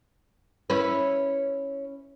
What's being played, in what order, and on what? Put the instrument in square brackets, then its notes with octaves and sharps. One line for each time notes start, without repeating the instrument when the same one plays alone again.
[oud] C#4 E4 B4